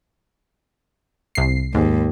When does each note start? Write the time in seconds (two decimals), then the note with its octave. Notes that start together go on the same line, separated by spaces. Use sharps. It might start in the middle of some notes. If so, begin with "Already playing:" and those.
1.35 C2 C7
1.75 D#2 G#2